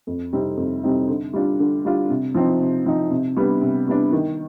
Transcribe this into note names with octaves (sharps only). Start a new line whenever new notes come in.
F2
C3 G3 C4 D#4
F2
C3 G3 C4 D#4
D3
G3 D4 F4
D3
G3 D4 F4
C3
F3 C4 D#4
C3
F3 C4 D#4
C3
G3 B3 D4
C3
G3 B3 D4
D#3